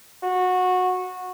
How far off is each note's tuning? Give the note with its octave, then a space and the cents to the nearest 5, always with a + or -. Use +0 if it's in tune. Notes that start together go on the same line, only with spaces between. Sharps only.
F#4 -15